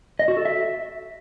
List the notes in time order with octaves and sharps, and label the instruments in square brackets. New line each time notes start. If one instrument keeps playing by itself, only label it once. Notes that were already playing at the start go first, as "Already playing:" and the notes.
[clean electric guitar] D#5
F#4
A4
E5